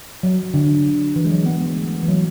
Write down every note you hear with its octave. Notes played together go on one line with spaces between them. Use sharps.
F#3
D3
E3
G#3
F#3
G#3 B3
G#3 B3
A3
E3
F#3